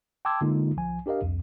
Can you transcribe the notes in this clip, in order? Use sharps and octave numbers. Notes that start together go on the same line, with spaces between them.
G5 A5 C6 D6 E6 G#6
D3 G#3 A#3 D#4 F4
B1 F3 G#5
D4 G4 A#4 D#5 F5
C2 F2